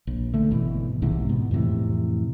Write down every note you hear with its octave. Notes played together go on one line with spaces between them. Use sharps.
A#1
D3 A3
G#1 B2 E3
B1 G#2 C3 E3
B2
F2 A2 C3 E3